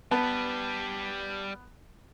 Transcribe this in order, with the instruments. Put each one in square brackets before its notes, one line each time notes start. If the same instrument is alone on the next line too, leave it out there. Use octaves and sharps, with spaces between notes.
[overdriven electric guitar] G3 B4 [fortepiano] B3 [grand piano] A5